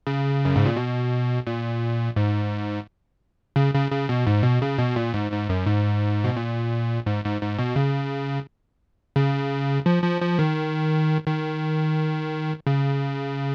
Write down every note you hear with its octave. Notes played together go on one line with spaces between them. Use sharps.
C#3
F#2
G#2
A#2
B2
A#2
G#2
C#3
C#3
C#3
B2
G#2
B2
C#3
B2
A#2
G#2
G#2
F#2
G#2
B2
A#2
G#2
G#2
G#2
B2
C#3
C#3
F3
F3
F3
D#3
D#3
C#3